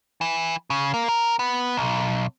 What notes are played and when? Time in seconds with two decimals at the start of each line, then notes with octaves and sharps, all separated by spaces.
0.21 E3
0.70 C#3
0.94 A#3
1.08 A#4
1.39 B3
1.77 B1